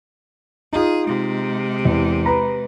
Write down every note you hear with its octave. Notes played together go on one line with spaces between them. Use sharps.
D#4 F4 G#4
C3 G#3
E2
B4 A#5 B5